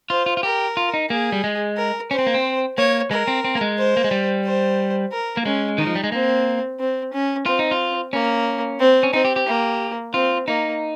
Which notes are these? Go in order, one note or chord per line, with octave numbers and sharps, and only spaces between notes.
F4 C5
F4
F4
G4 A#4
F4
D#4
A#3 G#4
G3
G#3
A#4
C#4 C5
C4
A#3
C4
A#3 C#5
G#3 A#4
C4
C4
A#3
G#3
C5
A#3
G#3
G3
C5
A#4
A#3
G#3 C#4
D#3 D#4
F3
G3
G#3
A#3 C4
C4
C#4
C4 F4
D#4
F4
A#3 C#4
C4
C#4
C4 D#4
G4
G4
A#3
C4 F4
A#3 D#4